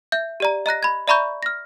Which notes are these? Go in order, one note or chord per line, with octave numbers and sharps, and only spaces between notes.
E5 G6
G4 D5 A#5
D#5 A#5 F#6 A#6
B5 G#6
D5 E5 A#5 B5 C#6 G6
F6 A#6